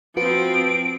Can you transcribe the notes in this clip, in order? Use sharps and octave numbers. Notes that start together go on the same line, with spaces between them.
F3 C4 F4 F#4 B4 D7